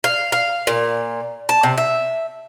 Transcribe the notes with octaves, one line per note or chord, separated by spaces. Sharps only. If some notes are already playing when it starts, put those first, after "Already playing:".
F5
F5
A#2
A5
C3
E5